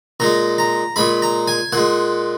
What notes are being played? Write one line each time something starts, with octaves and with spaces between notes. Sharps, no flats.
A#2 G#3 A#5
A#5
A#2 G#3 B5
A#5
G#5
A#2 G#3 F#5